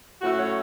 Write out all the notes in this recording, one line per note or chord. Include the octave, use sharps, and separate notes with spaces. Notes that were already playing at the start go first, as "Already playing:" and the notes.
A2 F#3 A3 C#4 F#4
C#5